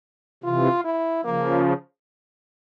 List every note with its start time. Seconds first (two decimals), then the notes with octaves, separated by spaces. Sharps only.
0.44 C3 E3 F4
0.84 E4
1.25 C#3 F3 A#3